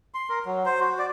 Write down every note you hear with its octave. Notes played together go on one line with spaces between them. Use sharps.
C6
A#4
F#3
C5
F#4
D5